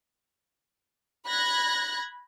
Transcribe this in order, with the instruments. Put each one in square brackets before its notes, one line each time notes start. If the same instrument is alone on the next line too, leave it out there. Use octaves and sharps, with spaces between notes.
[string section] B5 F#6 G#6 A#6